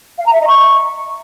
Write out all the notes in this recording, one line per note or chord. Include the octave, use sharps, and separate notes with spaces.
F5
A#5
E5
D#5
C#6